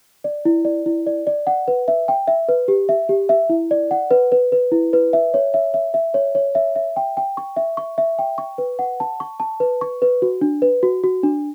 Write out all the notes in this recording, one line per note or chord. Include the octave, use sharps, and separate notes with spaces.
D5
E4
D5
E4
D5
D5
F#5
B4
E5
G5
E5
B4
G4
E5
G4
E5
E4
D5
F#5
B4
B4
B4
E4
B4
E5
C#5
E5
E5
E5
C#5
C#5
E5
E5
G5
G5
C#6
E5
C#6
E5
G5
C#6
B4
F#5
A5
C#6
A5
B4
C#6
B4
F#4
D4
B4
F#4
F#4
D4